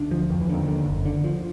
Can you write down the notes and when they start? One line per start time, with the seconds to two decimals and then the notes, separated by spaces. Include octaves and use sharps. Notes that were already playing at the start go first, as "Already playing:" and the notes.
Already playing: D2 D3 D4
0.11 F3
0.30 F2 D#3
0.41 E3
0.49 D#2 D3 D#3
0.68 D3
0.86 F#1
1.06 D3
1.24 F3